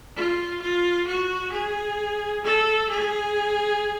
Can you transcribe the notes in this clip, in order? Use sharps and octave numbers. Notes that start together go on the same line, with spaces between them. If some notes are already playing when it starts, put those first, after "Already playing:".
F4
F4
F#4
G#4
A4
G#4